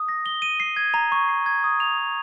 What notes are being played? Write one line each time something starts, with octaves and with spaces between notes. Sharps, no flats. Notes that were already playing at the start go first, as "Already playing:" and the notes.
Already playing: D#6
A#6
G7
D#7
C7
G#6
A#5
C#6
C7
G#6
D#6
F7
D#6